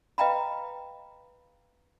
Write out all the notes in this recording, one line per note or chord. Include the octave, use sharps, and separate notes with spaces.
B4 D#5 F5 G5 A#5 B5